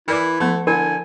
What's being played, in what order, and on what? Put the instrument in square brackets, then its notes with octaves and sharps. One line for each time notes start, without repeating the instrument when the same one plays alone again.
[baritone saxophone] E3 [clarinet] E4 [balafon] A#4 D5 D6
[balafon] F3 B3 [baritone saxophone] A3
[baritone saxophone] D3 [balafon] E4 [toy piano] A#4 [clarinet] G#5